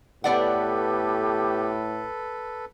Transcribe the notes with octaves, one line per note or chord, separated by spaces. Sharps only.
A2 B3 G4 A4 B4 D5 F#5